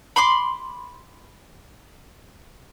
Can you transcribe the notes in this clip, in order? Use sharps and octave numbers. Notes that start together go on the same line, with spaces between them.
B5 C6 D6